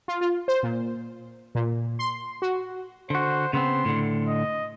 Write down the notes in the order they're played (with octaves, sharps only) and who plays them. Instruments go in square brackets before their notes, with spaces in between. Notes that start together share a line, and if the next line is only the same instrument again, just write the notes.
[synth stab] F4
F4
C5
A#2
A#2
C6
F#4
[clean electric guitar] D3 F#4 [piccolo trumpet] C5
[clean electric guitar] C#3 B3 C4 [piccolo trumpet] C6
[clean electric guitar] A2 D3
[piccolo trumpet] D#5